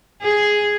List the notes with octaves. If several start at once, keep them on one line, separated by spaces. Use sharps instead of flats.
G#4